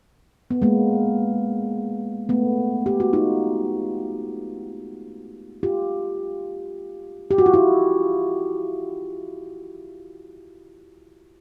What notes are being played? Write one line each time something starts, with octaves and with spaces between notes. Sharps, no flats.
B3
G#3 A#3
A3 B3
G4
F#4
D#4 F4
F4 G4
G4
F#4
F4
E4 F#4